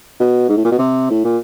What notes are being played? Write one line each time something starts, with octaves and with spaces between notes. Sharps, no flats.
B2
G#2
A2
A#2
B2
C3
A2
A#2